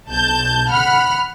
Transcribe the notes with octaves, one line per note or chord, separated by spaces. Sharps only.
B1 A5 G6
F#5 B5 F6